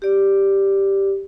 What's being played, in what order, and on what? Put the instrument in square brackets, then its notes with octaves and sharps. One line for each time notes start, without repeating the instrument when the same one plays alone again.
[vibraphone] G4 D5